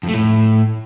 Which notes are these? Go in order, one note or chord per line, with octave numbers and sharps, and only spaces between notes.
F2
A3
A2